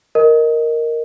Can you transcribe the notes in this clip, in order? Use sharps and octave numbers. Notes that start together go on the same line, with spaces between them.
A#4 D#5